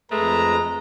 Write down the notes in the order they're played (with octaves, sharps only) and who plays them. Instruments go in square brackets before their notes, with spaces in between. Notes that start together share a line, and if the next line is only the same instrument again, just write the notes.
[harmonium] F2 B4 [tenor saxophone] G#3 [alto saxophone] A3 [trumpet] A#5